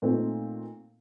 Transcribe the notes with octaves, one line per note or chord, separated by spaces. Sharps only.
A#2 A3 C4 D#4